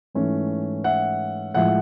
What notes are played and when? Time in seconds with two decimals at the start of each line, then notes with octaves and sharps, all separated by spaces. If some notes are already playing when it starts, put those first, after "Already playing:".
0.15 G#2 E3 A3 C#4
0.84 E5 F#5
1.54 A2 F3 G#3 E5 F#5